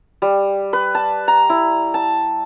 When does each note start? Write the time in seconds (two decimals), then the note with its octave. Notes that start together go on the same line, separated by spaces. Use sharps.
0.22 G3
0.73 B4
0.95 A5
1.28 A#5
1.49 E4
1.94 A5